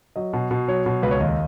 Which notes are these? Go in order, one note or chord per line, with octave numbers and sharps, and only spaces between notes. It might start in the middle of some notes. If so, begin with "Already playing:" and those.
F#3 D#5
B2
B2
F#3 C#5
B2
C#2 B4
C#5
D#2 D#5